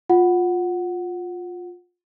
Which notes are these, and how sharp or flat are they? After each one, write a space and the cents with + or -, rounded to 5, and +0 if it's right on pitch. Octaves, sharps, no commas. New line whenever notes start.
F4 +20 F#5 +0